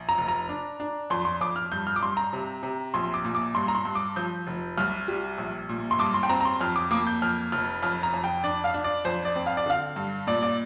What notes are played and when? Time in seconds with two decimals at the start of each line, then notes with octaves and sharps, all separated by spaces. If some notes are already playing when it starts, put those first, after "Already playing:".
Already playing: A#1
0.09 A#5
0.18 F1
0.28 A#5
0.49 D4
0.80 D4
1.10 F2 C6
1.25 C6
1.41 F2 D6
1.56 F6
1.72 G2 G6
1.87 F6
1.96 D6
2.01 G2 C6
2.17 A#5
2.33 C3
2.63 C3
2.94 A#1 C6
3.14 D6
3.24 A#2
3.35 D6
3.55 G2 C6
3.68 A#5
3.75 C6
3.85 G2
3.95 D6
4.16 F3 G6
4.47 F1
4.77 C2 F6
5.08 G3
5.38 A#1
5.69 A#2
5.91 C6
5.99 G2 D6
6.14 C6
6.23 G5
6.29 C4 A#5
6.41 A#5
6.45 C6
6.61 F2 F6
6.76 D6
6.91 A#3 D6
7.07 G6
7.22 F2 F6
7.52 F1 F6
7.83 F2 F6
8.03 A#5
8.14 F2
8.24 G5
8.44 D4 D5
8.64 F5
8.74 D4
8.84 D5
9.05 F2 C5
9.25 D5
9.36 C4
9.46 F5
9.57 D5
9.66 D3 F5
9.96 G2
10.27 A#2 D5
10.43 D5